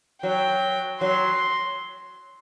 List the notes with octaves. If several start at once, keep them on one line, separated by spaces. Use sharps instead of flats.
F#3 G5
F#3 C6